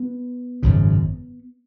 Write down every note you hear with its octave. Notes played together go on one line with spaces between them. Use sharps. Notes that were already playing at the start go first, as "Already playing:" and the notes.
Already playing: B3
G#1 F#2 C#3